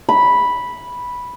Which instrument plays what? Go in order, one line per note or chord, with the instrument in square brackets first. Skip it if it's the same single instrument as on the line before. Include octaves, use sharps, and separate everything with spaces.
[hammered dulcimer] B5